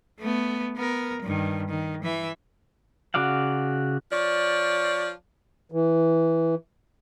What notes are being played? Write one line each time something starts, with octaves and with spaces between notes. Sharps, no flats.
A3 B3
B3 A#4
G2 D#3
D#3
E3 E5
C#3 F#4 D5 F5 F#5
F3 C#5 D5
E3